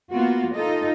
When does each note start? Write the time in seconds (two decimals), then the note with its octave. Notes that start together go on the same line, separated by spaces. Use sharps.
0.10 A#3 B3 F4 F#4
0.55 D#4 F4 A4 D#5